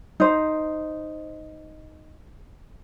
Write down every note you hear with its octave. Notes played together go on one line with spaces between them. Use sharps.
D#4 C5